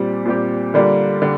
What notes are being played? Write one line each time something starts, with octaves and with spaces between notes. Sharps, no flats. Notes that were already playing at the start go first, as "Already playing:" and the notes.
Already playing: A#2 G3 C4 G4
A#2 G3 C4 G4
D3 G3 A#3 D4 F4
D3 G3